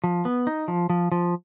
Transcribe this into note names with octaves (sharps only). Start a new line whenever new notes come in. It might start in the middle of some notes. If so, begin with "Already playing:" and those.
F3
B3
D#4
F3
F3
F3